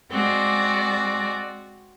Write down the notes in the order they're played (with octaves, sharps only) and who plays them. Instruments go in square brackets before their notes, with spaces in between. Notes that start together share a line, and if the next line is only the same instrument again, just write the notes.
[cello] G#3 D5 [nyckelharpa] C4 F#4